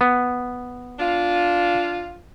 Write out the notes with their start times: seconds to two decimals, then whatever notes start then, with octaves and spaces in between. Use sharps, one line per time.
0.01 B3
0.99 D4 F4